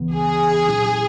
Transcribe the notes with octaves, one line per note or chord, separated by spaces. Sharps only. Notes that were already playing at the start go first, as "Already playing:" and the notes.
Already playing: C#2 C#3 E3 B3
G#4
A#2 F#3 C#4 E4